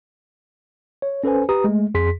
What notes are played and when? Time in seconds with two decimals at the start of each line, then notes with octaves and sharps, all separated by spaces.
1.02 C#5
1.24 C#4 A4 B4 C5 G#5
1.49 G4 B4 A#5 D#6
1.64 G#3 A3
1.94 F2 G#4 C6 B6